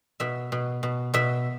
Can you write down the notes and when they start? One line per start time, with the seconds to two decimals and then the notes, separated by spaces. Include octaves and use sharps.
0.20 B2 E5
0.52 B2
0.83 B2
1.14 B2 E5